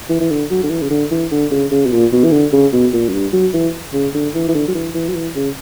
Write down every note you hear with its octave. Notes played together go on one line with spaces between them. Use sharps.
E3
E3
D3
F#3
D3
E3
C#3
D3
E3
D3
C#3
C#3
B2
A#2
B2
E3
D3
C#3
B2
A#2
F#2
G2
F#3
E3
C#3
D3
E3
E3
D3
F#3
E3
E3
F#3
E3
C#3